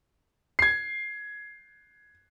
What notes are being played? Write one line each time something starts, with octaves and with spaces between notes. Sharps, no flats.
G#6 C7